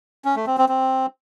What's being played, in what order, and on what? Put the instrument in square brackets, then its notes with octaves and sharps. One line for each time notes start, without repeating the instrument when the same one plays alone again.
[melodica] C#4
A3
C4
C4
C4